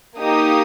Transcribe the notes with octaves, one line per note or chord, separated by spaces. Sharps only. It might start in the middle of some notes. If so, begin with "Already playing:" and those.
A#3 D#4 G4 D#6